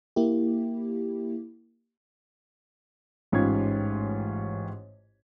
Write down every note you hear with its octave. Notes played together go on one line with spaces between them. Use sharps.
A#3 E4 G4
A1 G#2 C#4 F4 G4 G#6